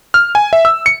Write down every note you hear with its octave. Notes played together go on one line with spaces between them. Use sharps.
F6
G#5
E5
E6
C#7